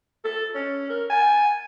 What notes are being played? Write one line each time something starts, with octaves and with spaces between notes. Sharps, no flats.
A4
C#4
A#4
G#5